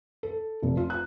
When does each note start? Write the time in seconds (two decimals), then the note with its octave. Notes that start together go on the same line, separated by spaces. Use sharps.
0.23 A4
0.63 F1
0.77 F4
0.90 F#6